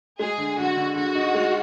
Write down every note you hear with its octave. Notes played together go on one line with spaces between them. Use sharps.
G#3 G#4
D3
D3 F#4
D3
D3 F#4
D#4
G#3